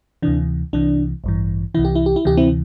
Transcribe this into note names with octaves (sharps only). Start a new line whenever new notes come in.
D2 C3 E3 D4
C2 C3 E3 D4
A1 G2 E3
C2 C3 E3 E4
G4
E4
G4
E4
D2 C3 E3 G4
C4 E4